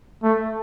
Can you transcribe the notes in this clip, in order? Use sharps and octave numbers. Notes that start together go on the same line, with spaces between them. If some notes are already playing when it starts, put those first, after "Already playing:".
A3